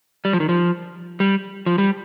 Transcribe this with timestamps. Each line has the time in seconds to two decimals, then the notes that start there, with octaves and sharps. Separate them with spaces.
0.25 G3
0.33 F3
0.40 D#3
0.49 F3
1.20 G3
1.66 F3
1.78 G3